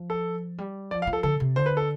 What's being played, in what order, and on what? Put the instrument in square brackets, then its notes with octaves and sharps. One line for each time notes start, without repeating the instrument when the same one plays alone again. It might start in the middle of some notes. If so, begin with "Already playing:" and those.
Already playing: [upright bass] F3
[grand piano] A4
[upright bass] G3
[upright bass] F3 [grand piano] D5
[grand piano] F5
[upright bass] F3
[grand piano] A4
[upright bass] D3 [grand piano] A4
[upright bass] C3
[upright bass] D3 [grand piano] C5
[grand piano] B4
A4